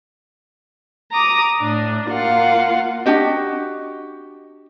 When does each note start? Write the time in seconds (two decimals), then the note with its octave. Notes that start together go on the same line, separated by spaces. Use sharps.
1.12 A#5 D6 D#6
1.59 A2 D4
2.08 A#3 F4 F5 F#5
3.06 D4 F#4 G4 D#5